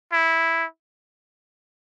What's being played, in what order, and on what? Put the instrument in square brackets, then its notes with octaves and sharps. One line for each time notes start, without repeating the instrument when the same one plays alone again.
[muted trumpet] E4